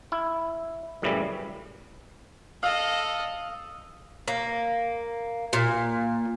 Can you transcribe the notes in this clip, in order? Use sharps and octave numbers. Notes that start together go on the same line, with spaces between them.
E4
F#2 A2 C#3 E3 G3
A4 D#5 F5 D#6 E6
A#3
A#2